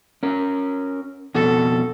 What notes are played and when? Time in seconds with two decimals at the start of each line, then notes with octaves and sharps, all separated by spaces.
0.23 C#4 A#4
1.35 F2 B2 F#4 A4